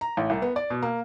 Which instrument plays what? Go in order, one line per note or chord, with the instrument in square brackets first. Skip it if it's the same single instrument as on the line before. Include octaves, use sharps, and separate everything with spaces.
[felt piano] A#5
A1
C2
B3
D5
B2
A#3